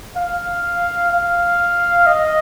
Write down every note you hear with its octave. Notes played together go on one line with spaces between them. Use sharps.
F5
F5
D#5